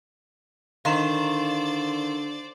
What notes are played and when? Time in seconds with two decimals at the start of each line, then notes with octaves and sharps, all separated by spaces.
0.85 D3 D#3 C5 D5 F5 C6 E7